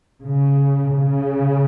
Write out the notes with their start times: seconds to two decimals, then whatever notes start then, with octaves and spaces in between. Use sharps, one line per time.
0.23 C#3
0.93 C#3